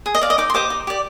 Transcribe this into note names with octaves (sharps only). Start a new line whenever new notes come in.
G#4
D#5
D5 F5
D#5
D#4 D6
C6
G4 C5 D#5 D6
D#4
G4 D5